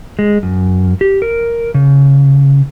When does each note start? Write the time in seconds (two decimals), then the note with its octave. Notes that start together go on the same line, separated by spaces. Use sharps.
0.19 G#3
0.43 F#2
1.01 G4
1.22 A#4
1.74 C#3